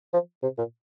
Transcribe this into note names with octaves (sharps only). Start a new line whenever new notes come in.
F3
C3
A#2